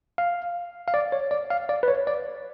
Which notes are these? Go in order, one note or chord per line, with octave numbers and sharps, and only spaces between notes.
F5
F5
D5
C#5
D5
F5
D5
B4
C#5
D5